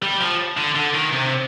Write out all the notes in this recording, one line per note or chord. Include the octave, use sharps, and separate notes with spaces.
G3
F3
D3
D3
D#3
C3